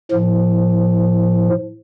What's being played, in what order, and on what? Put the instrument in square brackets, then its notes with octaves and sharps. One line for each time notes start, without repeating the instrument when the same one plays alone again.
[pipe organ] A2 F3